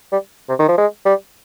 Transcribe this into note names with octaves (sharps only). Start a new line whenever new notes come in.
G3
C3
D#3
F3
G#3
G3